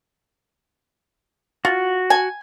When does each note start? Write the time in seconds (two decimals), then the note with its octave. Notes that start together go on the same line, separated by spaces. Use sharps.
1.65 F4 F#4
2.10 G#5